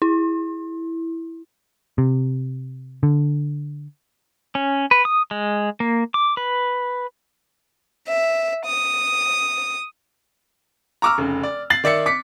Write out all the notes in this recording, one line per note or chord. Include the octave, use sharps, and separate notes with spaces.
E4
C3
D3
C#4
B4
D#6
G#3
A#3
D6
B4
E5
D#6
A#5 C#6 D6 E6 F6
F1 C#3
D5
A6 C7 F#7
D#3 D5 E5 C#7
D6 B6 C#7